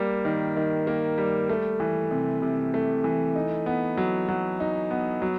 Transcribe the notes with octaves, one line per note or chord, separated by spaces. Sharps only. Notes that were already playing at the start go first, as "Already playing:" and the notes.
Already playing: G3 A#3
D#3
D#3
A#3
G3
A3
E3
C3
C3
A3
E3
D#4
B3
F#3
F#3
D#4
B3
F#3